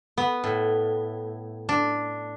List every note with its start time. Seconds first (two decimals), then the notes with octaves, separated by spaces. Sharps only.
0.18 B3
0.44 A2
1.69 D4